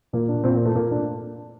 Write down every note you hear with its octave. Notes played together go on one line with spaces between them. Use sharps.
A#2 A#3
D4
A#2 C4
A#3
A3
A#2 A#3
D4